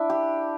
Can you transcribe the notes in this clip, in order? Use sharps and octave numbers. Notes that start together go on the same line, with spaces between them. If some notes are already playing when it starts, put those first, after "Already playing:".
Already playing: D4 E4
G4